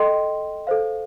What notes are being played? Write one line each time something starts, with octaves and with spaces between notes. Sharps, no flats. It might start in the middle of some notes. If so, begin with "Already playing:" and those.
Already playing: A4 D#5 G5 C6
A4 C5 F5